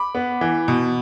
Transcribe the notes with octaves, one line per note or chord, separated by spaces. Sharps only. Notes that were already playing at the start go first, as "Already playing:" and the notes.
Already playing: B5 D6
B3
E3
B2